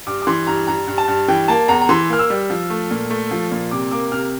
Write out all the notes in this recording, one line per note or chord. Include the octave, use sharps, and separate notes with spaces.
G2 D6
D6
E3 C6
G2 A#5
G2 A#5
G2
A5
G2
E3 G5
A#3 A5
E2 A#5
A#5
E3 C6
A#3 F6
E6
G3
F3
A3
A#2
A3
F3
A#2
C3 D6
A#3 D6
C3 F6